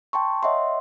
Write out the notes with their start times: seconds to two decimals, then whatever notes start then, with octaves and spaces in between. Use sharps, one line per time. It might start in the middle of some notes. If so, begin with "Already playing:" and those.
0.13 G5 A5 C6 C#6
0.43 C#5 D#5 E5 F#5 C6